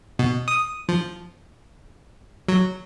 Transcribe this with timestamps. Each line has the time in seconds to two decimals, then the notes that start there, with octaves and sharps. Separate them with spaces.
0.19 B2
0.48 D#6
0.89 F3
2.49 F#3